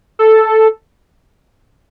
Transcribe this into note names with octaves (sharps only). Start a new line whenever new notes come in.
A4